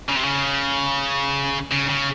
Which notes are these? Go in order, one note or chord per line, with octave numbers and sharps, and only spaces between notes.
C#3
C3
C#3
C#3
C#3